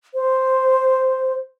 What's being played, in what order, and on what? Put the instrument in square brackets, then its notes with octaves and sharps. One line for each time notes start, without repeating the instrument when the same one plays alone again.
[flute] C5